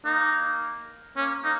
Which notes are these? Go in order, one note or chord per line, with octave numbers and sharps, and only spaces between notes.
A#3 D#4
A#3 C#4
A#3 D#4